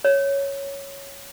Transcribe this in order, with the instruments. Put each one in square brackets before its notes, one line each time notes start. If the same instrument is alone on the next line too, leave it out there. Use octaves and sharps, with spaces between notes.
[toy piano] C#5